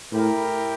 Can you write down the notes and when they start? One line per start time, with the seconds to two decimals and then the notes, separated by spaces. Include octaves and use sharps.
0.12 A2 E4 G4 A#4